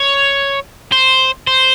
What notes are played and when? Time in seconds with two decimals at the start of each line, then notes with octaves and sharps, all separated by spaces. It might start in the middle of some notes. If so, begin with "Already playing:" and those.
Already playing: C#5
0.92 C5
1.47 C5